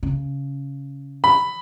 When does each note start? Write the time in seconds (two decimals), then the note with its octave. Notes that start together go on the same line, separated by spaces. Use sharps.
0.03 C#3
1.24 B5